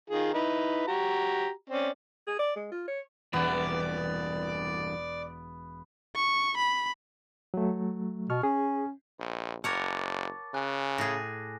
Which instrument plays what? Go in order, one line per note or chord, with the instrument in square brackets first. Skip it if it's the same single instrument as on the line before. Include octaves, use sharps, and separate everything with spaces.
[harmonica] D#3 F4 G#4
D#4 E4 B4
F#4 G4 A#5
C4 C#4 D5
[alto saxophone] G#4
D5
G#3
F4
C#5
[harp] E1 [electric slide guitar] G2 E3 F#5 [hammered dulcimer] B3 [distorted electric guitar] D5
[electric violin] C#6
B5
[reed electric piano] F#3 A3
[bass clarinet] B2 [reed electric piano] C#6 F6
[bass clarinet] C#4 [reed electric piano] G#4
[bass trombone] A#1
[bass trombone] F#1 [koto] A#4 C#5 F#5 [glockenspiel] A5 D6 A6
[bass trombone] C#3 [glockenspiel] G#5 F#6
[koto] A2 G#4 [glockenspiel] A#6